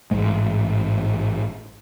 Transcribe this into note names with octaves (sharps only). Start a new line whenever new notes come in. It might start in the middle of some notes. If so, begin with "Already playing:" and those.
A1 G#2 G#3